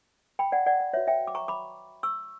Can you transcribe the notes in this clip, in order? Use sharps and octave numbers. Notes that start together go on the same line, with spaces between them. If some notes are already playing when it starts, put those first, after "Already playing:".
G5 B5
D5 F#5
D5 F#5
D5
F#4 B4 C#5 E5
E5 G5
D6
A#5 C#6
B5 D6
C#6 E6